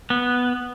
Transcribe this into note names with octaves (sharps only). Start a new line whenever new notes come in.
B3